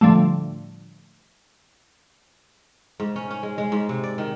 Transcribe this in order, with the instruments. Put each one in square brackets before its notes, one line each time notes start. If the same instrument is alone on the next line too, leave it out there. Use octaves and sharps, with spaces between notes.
[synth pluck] A2 D3 F3 G3 A3
[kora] G#2
C#4
C#4
G#3
G#3
G#2
C3
D5
D#3